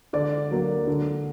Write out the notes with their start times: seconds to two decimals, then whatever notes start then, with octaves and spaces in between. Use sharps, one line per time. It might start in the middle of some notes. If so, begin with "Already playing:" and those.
0.13 D3 D5
0.51 F#3 A#3
0.87 D3